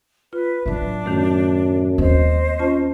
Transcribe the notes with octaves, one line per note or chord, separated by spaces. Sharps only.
F4 B4
A2 F#3 D4 E5
F#2 D#3 A3
D#2 C4 C5 D#5
C#4 F4 A5